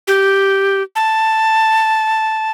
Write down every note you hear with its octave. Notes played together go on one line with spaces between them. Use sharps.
G4
A5